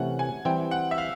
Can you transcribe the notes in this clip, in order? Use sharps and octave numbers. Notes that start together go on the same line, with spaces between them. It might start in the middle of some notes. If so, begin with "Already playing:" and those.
Already playing: C3 E3 A3 C#4 F#5
G#5
E3 G3 C4 G5
F#5
E5
F5